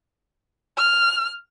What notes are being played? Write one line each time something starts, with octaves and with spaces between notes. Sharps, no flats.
F6